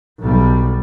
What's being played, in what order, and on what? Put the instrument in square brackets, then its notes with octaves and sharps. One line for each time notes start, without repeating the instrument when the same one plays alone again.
[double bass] B1 G3